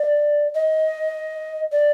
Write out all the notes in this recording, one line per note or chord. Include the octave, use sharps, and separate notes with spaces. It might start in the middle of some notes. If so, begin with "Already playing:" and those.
Already playing: D5
D#5
D5